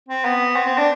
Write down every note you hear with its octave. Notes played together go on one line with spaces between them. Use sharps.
C4
B3
C4
C4
D4